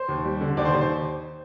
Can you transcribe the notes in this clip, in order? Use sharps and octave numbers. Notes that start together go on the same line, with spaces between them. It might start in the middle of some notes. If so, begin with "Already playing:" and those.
Already playing: C5
D#2
G3
D3
D#2 D5
C5
D#2
C5